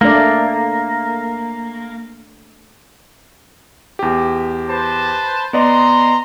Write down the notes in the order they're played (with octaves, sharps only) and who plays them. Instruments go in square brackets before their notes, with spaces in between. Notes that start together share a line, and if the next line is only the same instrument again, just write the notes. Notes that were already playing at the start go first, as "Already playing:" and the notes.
[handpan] A3 D4 D5 [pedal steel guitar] A#3
[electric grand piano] E2 G4
[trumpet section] B4 C5 A5
[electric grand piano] B3 D5 D#5 [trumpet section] A#5 C6